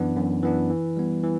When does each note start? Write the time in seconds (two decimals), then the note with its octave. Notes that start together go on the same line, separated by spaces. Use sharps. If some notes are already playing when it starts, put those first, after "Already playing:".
Already playing: F#2 E3 B3 D4
0.16 F#2
0.43 E3 B3 D4
0.70 E3
0.97 G3 B3
1.24 E3